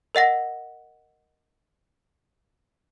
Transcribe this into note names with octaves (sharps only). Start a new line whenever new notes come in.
A#4 D#5 F#5 A#6